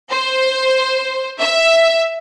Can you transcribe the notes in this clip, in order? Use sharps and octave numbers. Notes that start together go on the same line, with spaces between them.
C5
E5